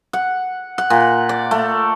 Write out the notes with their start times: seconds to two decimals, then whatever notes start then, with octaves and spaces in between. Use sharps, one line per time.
0.13 F#5
0.78 F#5
0.90 A#2
1.29 D5
1.51 A3